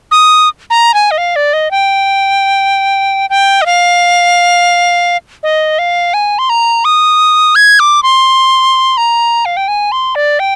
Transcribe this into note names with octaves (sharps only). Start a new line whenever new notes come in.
D#6
A#5
G#5
D#5
F5
D5
D#5
G5
G5
D#5
F5
D#5
F5
G#5
C6
A#5
D#6
G#6
D6
C6
A#5
F5
G5
G#5
C6
D5
G5